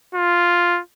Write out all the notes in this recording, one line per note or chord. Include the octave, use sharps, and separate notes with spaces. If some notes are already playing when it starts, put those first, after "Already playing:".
F4